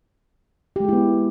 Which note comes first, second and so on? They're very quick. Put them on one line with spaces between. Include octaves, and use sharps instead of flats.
G4 G#3 G#4 E4 B3